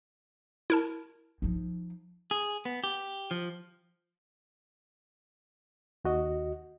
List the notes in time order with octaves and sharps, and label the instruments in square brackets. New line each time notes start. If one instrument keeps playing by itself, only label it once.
[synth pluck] E4 A#4 A5
[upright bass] F3 D#4
[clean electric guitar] G#4
B3
G4
F3
[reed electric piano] D#2 F#4 D#5